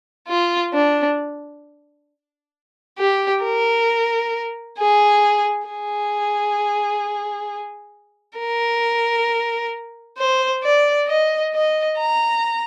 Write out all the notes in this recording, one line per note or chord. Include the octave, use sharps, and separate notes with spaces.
F4
D4
G4
A#4
G#4
G#4
A#4
C5
D5
D#5
D#5
A#5